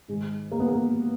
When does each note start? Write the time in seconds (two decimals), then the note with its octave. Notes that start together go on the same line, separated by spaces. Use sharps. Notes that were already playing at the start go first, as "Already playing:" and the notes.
0.08 G#2 D#3 G#3
0.52 A#3
0.60 B3
0.68 A#3